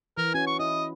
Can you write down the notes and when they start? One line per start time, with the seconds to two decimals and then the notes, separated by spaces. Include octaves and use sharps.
0.17 E3 A#4
0.34 C#4 F#4 G#5
0.47 C#6
0.59 E4 D#5